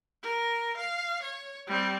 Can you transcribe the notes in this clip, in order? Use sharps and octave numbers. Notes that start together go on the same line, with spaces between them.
A#4
F5
C#5
G3 C4